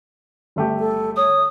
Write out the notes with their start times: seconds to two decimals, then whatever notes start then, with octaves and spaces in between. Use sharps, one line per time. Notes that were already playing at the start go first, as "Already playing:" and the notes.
0.56 G1 A3 G4
0.79 A4
1.17 C#5 D#6